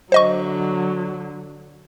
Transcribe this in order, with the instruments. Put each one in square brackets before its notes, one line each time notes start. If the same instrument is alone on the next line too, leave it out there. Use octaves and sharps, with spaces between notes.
[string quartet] D3 F#3 [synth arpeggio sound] C5 D#5 C#6